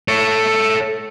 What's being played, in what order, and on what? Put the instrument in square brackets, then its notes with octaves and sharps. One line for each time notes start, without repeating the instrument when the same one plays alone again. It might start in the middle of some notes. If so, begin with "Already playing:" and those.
[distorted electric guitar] A4 C#5